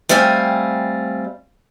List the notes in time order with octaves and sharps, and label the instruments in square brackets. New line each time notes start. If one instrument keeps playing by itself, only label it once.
[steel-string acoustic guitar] G3 A3 C4 F5 G#5